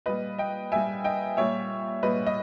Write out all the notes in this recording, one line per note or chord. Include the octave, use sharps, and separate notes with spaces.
A#2 G3 B4 D#5
D#5 G5
A#2 G3 E5 G#5
D#5 G5
A#2 G3 C#5 E5
A#2 G3 B4 D#5
D#5